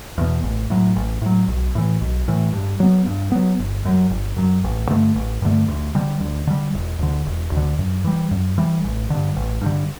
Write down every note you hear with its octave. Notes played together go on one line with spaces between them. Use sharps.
E2 B2
A1
A2 F#3
A1
A2 F#3
B1
A2 E3
B1
A2 E3
G2
F#3 B3
G2
F#3 B3
G1
F#2 F#3
G1
F#2 F#3
A1
G2 D3 A3
A1
G2 D3 A3
D2
D3 G3
D2
D3 G3
E1
D2 D3
E1
D2 D3
F#2
E3 G3
F#2
E3 G3
A1
G2 D3
A1
G2 D3